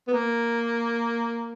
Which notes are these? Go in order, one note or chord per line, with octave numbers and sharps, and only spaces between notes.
B3
A#3